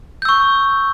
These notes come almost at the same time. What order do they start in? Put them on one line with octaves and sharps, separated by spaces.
G6 E6 C#6